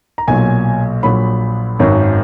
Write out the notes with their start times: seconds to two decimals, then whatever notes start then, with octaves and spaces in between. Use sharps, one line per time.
0.18 A#5
0.27 B1 A#2 F#3 G#5
1.03 A#1 A#2 F#3 B5
1.79 G#1 F#2 D#3 F#3